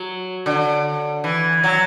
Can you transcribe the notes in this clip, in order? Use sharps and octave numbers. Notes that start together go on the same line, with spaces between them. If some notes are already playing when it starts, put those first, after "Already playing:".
Already playing: F#3
D3
E3
F#3